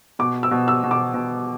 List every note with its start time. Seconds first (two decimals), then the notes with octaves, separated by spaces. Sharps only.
0.19 B2 D6
0.43 E6
0.51 B2
0.68 E6
0.83 B2
0.91 D6
1.14 B2